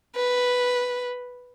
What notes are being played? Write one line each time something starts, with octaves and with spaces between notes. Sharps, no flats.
B4